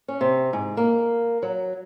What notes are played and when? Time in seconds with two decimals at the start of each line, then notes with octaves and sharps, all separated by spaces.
0.08 C#4
0.21 C3
0.53 G#2
0.77 A#3
1.43 F#3